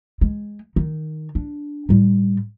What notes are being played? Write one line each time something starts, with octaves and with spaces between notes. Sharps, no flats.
G#3
D#3
D4
A2 G3